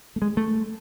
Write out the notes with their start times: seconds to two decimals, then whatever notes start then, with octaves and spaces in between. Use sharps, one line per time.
0.16 A3
0.22 G#3
0.37 A3